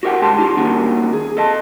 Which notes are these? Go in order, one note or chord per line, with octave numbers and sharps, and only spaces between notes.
F#4 G4 A#4 E5 F#5 G5
G#2 C#3 G4 G#4 A5 C6
D#4 F4 G4
D#3 A#3 C#4 D#4 F#4 A#4
G#4
A4 D#5 A5